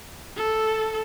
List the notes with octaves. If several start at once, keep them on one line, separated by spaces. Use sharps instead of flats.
A4